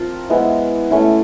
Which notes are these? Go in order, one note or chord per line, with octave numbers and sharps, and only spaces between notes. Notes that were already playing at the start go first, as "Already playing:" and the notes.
Already playing: F3 C4 F4 A#4
G#3 B3 E4
A3 C#4 E4